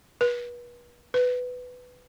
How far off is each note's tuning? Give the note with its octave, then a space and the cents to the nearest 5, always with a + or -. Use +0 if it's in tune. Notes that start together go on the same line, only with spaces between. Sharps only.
B4 -35
B4 +10